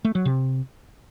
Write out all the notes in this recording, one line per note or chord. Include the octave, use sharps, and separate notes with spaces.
A3
F#3
C3